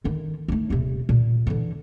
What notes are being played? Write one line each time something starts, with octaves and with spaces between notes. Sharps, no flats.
D3 D#3
A3 D#4
D#1 C3
A#2
D3 E3